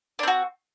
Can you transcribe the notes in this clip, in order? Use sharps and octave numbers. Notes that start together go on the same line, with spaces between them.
C4 D4 F#4